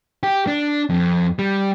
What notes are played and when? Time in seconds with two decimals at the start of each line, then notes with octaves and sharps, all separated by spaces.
0.23 G4
0.47 D4
0.89 F2
1.39 G3